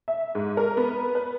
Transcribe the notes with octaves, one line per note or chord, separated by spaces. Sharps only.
E5
G#2
A#4
B3
B4